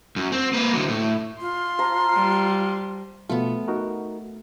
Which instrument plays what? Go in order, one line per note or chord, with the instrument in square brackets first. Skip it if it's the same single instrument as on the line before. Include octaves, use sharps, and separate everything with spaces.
[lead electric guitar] F#2
C4
A#3 B4
D3 F#3
A2
[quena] F4 [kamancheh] C6
[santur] C5 A5 A#5
[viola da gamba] G3
[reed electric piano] B2 F3 F4 [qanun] A3 B3
[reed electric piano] D#4 F#4 A#4